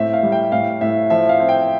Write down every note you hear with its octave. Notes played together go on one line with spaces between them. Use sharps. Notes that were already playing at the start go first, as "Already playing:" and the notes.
Already playing: A2 C4 E5
F5
G3
G5
A2 F5
A2 E5
F3 E5
F5
C4
G5